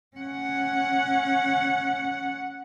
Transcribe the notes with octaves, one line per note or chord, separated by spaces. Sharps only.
C#4 F#5